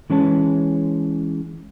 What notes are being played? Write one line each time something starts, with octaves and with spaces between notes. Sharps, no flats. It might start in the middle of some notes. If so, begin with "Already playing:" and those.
E3 G#3 C#4 B4 C#5 A5